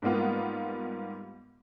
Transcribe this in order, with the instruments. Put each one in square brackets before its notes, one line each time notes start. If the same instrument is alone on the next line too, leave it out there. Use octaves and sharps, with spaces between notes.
[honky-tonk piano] G#2 G3 A#3 B3 F4